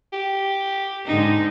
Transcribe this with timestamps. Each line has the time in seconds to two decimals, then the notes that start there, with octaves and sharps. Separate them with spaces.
0.13 G4
1.06 G#2 D3 D#4